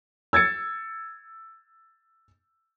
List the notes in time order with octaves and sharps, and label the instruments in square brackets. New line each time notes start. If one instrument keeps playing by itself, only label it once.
[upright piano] E6 G#6 A6 C#7